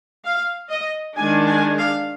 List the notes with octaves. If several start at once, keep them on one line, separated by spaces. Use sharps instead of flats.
F5
D#5
D#3 G#3 D4 G#5
G#5
F5